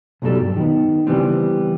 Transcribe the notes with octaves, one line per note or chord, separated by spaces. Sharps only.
B1 F2 B2 F#3 G3 A4
G2
D#3 B3
C#3 E3 G3 B3 C4